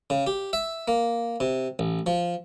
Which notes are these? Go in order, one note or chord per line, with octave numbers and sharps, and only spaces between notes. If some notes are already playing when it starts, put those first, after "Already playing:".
C#3
G4
E5
A#3
C3
A1
F3